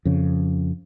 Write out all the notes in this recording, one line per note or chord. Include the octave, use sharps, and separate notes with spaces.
F2 C#3